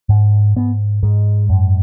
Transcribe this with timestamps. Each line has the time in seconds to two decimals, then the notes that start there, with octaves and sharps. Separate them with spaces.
0.09 G#2
0.56 G#2 B3
1.03 G#2 G#3
1.49 F#2